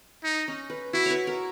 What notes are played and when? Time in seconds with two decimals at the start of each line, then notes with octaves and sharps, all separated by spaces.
0.24 D#4
0.48 C#4
0.70 B4
0.93 E4 F#4
1.06 B4 C#5
1.27 A#4